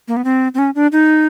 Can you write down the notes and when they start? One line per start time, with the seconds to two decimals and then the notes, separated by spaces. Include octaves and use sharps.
0.08 A#3
0.17 B3
0.25 C4
0.54 C4
0.59 C#4
0.75 D4
0.92 D#4